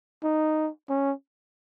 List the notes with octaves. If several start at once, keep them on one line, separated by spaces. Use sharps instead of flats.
D#4
C#4